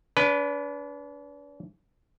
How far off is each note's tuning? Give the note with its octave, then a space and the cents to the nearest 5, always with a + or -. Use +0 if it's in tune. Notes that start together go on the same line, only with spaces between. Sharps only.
D4 -40 B4 +0